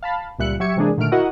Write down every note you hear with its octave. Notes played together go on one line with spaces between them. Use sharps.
F5 A5 B5
C#2 A#2 G3 E5 F#6 C#7
F#3 G4 E5 C#6 G#6 C#7
C3 E3 G#3 A#3 D4 G#4
A#2 D3 D#3 A3 F6 D7
E4 F#4 A#4 D#5 F#5